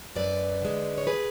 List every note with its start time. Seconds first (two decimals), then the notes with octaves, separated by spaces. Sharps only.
0.15 F#2 B4 D5
0.62 D3 G#3
0.98 C#5
1.07 G#4 B4